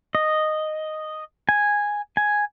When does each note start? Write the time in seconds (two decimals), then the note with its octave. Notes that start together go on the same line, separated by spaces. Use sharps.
0.15 D#5
1.49 G#5
2.17 G#5